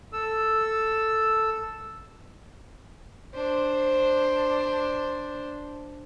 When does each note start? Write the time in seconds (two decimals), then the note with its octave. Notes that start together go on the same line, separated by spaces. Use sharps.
0.13 A4 E6
3.34 D4 C5